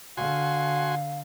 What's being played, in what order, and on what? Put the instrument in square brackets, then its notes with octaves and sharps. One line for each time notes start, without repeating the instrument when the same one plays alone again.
[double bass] D3 [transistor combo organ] F#4 G#5 C6 [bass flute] F5